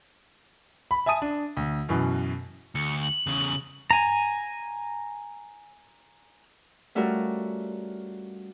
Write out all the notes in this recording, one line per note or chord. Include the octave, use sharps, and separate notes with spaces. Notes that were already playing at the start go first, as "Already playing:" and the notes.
B5
E5 G#5 A5 D#6 D#7
D4
D2
F#2 B2 E3
D2 C#7
F#7
E2 C#3
G#5 A#5
G3 A3 C#4 F4 F#4 A#4